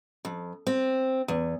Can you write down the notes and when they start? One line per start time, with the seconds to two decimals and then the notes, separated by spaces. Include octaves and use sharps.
0.25 F2
0.67 C4
1.28 E2